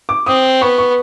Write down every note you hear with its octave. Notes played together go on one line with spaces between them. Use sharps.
D6
C4 D#6
B3 C#6
C#6